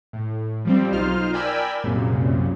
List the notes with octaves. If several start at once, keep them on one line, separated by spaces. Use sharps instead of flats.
A2
F3 G3 C4
B1 D#4 F4 C5 F6
A#4 D5 G5 G#5 B5 E6
C2 F#2 A#2 C#3